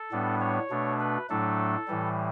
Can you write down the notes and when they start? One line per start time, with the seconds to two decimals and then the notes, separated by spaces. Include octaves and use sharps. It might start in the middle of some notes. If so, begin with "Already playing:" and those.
Already playing: A4
0.12 A2 G3 B3 D4
0.41 C#5
0.70 B2 A3 D4
1.00 B4
1.29 A2 F#3 A3 D4 A4
1.88 A2 E3 G3